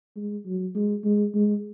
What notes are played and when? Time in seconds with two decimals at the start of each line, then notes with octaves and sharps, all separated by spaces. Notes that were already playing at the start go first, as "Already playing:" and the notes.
0.16 G#3
0.46 F#3
0.75 G#3
1.04 G#3
1.34 G#3